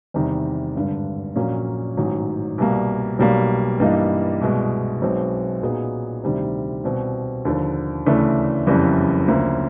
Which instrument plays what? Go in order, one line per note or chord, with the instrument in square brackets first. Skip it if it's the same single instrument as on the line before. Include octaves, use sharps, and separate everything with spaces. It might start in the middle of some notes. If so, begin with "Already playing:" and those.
[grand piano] E2 C3 D#3 G3
G#1 G2 D3
A#1 A#2 F#3 A#3 C#4
A1 G#2 D#3 F#3
C2 B2 G3 A#3
B1 B2 G3 A#3
G2 E3 G3 A#3 D#4
C2 B2 G#3
B1 B2 G#3 C4
A#2 F#3 B3 D#4 G#4
D2 C3 D#3 G3 C4
C2 B2 G3 C4
D#2 D3 F3
D2 C#3 E3 A3 D4
F#1 F2 C#3 E3 G3
D2 C#3 F3 A#3